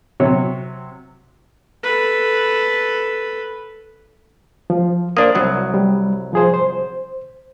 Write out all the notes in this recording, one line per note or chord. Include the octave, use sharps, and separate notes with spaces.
C3 F#3 C#5
A4 B4
F3
A#3 D4 C5 D#6
C2 F#3
G3
F3 G#4 C5
C5